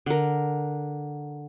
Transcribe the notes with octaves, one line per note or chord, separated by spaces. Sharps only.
D3 A#4